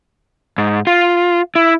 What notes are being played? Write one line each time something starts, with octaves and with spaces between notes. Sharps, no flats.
G#2
F4
E4